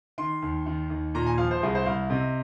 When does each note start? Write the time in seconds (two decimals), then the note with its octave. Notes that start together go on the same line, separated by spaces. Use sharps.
0.18 D#3 C6
0.42 D#2
0.66 D#3
0.90 D#2
1.15 A#2 A#5
1.26 G#5
1.38 F3 F5
1.51 C5
1.62 C2 G#4
1.75 C5
1.86 C2 F5
2.10 C3 D#5